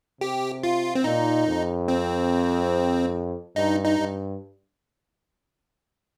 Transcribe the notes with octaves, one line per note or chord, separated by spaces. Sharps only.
C3 G4
F4
C4
A#2 D#4
F2
C4
G2 D#4
D#4
G2